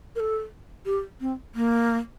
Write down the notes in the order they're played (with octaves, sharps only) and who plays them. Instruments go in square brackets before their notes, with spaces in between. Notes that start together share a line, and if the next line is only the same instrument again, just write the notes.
[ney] A#4
A4
G4
C4
A#3